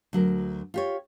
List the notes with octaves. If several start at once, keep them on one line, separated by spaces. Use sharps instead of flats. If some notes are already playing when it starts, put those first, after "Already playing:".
D2 F#3 A#4
F4 G4 C#5